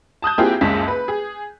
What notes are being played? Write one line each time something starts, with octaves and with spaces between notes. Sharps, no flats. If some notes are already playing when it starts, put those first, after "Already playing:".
A5 D#6 F#6 G6
A#3 C4 E4 F4 G4 G#4
F#1 C#2 G#3 C#4 A5 B6
B4
G#4